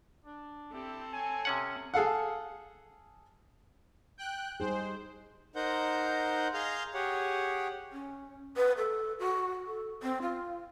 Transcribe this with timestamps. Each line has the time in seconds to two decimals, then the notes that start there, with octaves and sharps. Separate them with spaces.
0.25 D4
0.73 C4 E4 G4 A4
1.13 C#5 G#5
1.45 C3 C#4 F#5
1.94 G#4 A4 F5 F#5
4.18 G5 F#6
4.60 G3 D#4 G#4 C5
5.56 D#4 A#4 C5 F#5 G6
6.54 G#4 F5 A#5 C6 G6
6.94 G4 G#4 C#5 F#5
7.92 C#4
8.57 B4
8.78 A4
9.19 F#4
9.67 A4
10.03 C4
10.22 F4